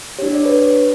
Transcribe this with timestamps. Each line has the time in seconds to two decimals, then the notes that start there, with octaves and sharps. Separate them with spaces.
0.19 D4 G4 C#5
0.33 D5
0.45 B4 C#5